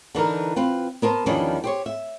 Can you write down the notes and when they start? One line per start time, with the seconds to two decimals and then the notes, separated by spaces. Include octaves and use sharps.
0.15 D3 E3 D#4 A#4
0.56 C4 F4 B4
1.02 B3 A#4 C5 A5
1.26 E2 D#3 F3 G3 C#4 D4
1.64 G4 C5 C#5
1.86 E5